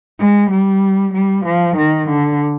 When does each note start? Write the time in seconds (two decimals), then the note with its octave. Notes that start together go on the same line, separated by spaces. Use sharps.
0.19 G#3
0.51 G3
1.14 G3
1.45 F3
1.77 D#3
2.09 D3